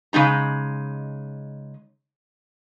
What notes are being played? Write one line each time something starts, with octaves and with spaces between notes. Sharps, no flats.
C#3 G#3 D#4 A#5